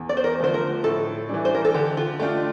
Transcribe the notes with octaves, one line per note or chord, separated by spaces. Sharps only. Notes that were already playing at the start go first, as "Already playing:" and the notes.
Already playing: E2
D5
C5
A#4
D3 F3 A3 C5
A#4
A2 A4
E3 G3 D4
C5
A#4
A4
D3 G4
F4
A3 D4 F4 G4